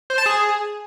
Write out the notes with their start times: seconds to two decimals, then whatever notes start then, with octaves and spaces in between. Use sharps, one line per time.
0.10 C5
0.18 A5
0.26 G#4